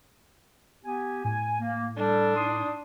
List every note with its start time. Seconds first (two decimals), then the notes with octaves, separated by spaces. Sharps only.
0.85 B3 G4 G#5
1.24 A2 G#5
1.61 A#3
1.97 G3 D4 A4
2.35 D#4 C6 D#6